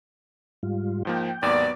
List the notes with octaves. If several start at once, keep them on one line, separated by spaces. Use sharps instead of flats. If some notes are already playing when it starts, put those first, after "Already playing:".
G#2 G3 F4
G#2 F3 A#3 G5
G#1 D#2 F#3 B3 D5